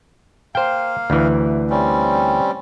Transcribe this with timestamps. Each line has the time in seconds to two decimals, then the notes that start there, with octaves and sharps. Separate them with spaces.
0.55 A#3 C5 F5 G5
1.10 D2 E3
1.70 G3 C4 C#4